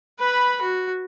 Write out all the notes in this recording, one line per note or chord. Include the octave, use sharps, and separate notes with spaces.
B4 B5
F#4